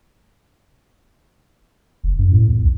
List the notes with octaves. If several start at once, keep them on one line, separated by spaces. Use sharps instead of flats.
F#1
F#2
A2
E2
B1